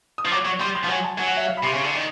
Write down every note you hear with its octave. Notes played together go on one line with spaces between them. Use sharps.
D#6
F3
F#3 D6
F#3 C#6
G3 C6
C6
F3
F#3 G#5
A5
F#3 G#5
F#5
E5
F5
B5
C3 C6
C#3
D3
D#3